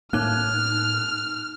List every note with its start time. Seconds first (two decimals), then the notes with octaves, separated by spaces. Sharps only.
0.13 A2 A#3 D#4 F6 F#6